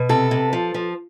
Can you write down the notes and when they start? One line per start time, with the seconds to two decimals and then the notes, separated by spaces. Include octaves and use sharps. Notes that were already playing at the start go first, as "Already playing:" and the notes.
Already playing: B2
0.09 C3 A4
0.31 C3
0.53 F3
0.74 F3